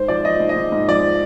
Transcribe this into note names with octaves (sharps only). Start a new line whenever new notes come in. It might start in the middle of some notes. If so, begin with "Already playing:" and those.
Already playing: G#2 C5
F3 D5
F3 D#5
G#2
D#5
G#2
G#2
F3 D5